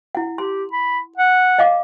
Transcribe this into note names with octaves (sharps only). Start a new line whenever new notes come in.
E4 F#5
G4 C6
B5
F#5
D#5 F5 D6